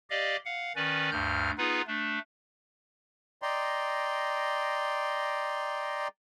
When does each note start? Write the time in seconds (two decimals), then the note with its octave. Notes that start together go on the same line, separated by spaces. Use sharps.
0.10 G4 D5 D#5 F5
0.45 F5 F#5
0.76 D#3 C#4 B4 D5
1.11 D2 G2 F6 G6
1.58 B3 D#4 F4 G#4 B4
1.87 A3 D4
3.42 D5 D#5 G5 A#5 C6